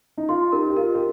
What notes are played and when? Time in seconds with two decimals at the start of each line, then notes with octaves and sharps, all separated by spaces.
0.18 D#4
0.29 F4 C6
0.52 D#4 G4 A#4
0.70 G4
0.77 F4 A#4
0.94 G4